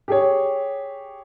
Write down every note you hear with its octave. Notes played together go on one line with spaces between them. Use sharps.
G4 G#4 C#5